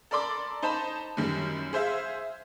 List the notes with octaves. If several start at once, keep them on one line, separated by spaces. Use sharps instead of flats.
A4 A#4 D5 B5 C6 D6
D#4 C5 A5 B5
F#2 D#3 G3
G#4 C5 E5 F5